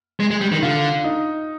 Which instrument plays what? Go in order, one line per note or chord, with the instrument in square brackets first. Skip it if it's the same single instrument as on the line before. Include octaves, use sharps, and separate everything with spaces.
[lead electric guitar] G#3
G#3
G3
D#3
[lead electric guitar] D3 [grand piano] F4
[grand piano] D#4